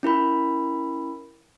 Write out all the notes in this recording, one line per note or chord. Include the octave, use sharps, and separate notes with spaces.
C#4 E4 A#4 B5